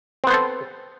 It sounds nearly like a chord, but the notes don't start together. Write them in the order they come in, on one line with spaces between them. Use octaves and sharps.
C4 B3 C5 A4